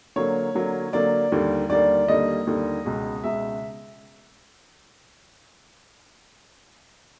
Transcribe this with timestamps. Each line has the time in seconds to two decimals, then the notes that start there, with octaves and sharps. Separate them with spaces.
0.16 D3 F#3 A#3 C#5
0.55 D3 F#3 A#3
0.93 D3 F#3 A#3 D5
1.32 D#2 D3 G3 A#3
1.69 D#2 D3 G3 A#3 D5
2.08 D#2 D3 G3 A#3 D#5
2.47 D#2 D3 G3 A#3
2.85 C#2 B2 G#3
3.24 C#2 B2 G#3 E5